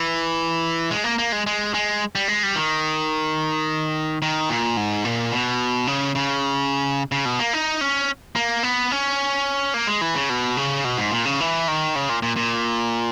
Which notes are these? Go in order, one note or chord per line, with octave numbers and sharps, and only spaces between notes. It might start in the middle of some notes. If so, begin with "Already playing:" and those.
Already playing: E3
G#3
A#3
A#3
G#3
G#3
G#3
G3
G#3
G3
D#3
D#3
A#2
G#2
A#2
B2
C#3
C#3
C#3
B2
A#3
D#4
C#4
A#3
B3
C#4
A#3
G#3
E3
C#3
B2
C#3
B2
G#2
A#2
C#3
E3
D#3
C#3
A#2
A#2
A#2